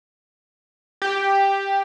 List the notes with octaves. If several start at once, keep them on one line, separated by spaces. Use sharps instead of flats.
G4